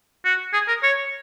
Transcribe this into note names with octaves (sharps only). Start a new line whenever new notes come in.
F#4
G#4
A#4
C#5